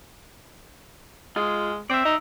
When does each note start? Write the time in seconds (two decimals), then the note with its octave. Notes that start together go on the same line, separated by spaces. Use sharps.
1.36 G#3 F4 G#4
1.90 C4 D5 E5
2.05 D#4